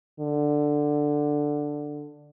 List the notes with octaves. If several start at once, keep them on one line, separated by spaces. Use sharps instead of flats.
D3